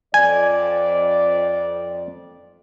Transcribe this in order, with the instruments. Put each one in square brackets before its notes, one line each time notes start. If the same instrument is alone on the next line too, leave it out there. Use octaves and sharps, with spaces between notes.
[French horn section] F2 D5 [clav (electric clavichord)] G#5